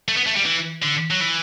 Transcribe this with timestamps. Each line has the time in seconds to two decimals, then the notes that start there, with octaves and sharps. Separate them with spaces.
0.08 A3
0.17 B3
0.26 A3
0.36 G3
0.45 E3
0.82 D3
1.11 F#3
1.20 E3